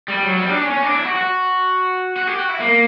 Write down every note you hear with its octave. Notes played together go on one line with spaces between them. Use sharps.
G3
F#3
G3
D4
C#4
C#4
D4
E4
F#4
F#4
F#4
G4
F#4
E4
A#3